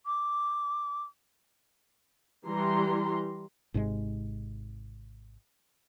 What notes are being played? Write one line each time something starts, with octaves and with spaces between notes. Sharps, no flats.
D6
E3 G3 A#5 C6
G#1 G#2 C3 G#3